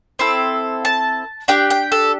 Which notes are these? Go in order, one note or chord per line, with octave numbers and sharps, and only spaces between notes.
C4 E4 A4
A5
D4 G4 G5
G5
A4